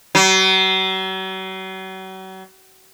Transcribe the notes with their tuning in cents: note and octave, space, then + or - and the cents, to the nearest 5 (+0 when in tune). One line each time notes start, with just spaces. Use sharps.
F#3 +40